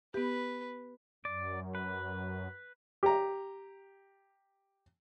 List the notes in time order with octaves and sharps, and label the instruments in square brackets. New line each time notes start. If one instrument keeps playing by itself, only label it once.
[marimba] B3 G4 [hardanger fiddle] B4
[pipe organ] F#2 [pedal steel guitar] D5
[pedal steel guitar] B4
[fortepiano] G4 A#5